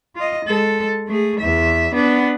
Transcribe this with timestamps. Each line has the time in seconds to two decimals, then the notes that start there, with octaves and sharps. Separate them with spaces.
0.15 F4 D#5
0.45 G#3 A4
1.07 A3 G#4
1.40 E2 E5
1.94 B3 D4